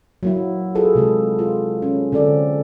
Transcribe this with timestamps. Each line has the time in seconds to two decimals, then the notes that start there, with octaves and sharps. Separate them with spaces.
0.23 F#3 A#3 E4
0.75 F4 G#4 A4 B4
0.95 C3 G#3 A4
1.39 F4
1.82 C#4
2.12 D3 C4 A4 D5